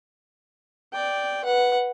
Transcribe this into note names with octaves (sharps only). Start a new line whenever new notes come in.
D5 G5
B4 F#5